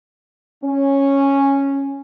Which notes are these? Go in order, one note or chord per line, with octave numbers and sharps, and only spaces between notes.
C#4